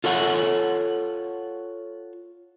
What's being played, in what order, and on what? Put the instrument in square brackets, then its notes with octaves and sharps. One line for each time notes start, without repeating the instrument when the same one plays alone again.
[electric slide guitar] F4 A4 C#5 F#5